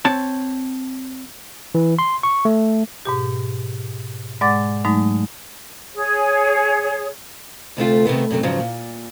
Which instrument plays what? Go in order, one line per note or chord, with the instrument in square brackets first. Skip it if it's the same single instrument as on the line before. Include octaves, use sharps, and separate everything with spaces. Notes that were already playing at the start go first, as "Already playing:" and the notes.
[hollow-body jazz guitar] C4 C#5 A5
[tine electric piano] E3
C6
C#6
A3
[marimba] G#2 B2 G4
G#2 G#3 D5 F#5 D6 A6
G#2 F#3 G#3 A3 D#4
[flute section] G#4 C#5
[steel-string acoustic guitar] D2 C3 A3 F4
C3 D#3 A3 B3
F#2 C3 F#3 A3
E2 G#2 C#3 F3 F#3
A#2